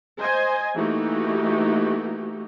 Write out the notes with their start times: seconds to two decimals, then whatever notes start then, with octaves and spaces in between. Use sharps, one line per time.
0.19 C5 D#5 G#5
0.76 E3 A3 A#3 D#4 F#4 G4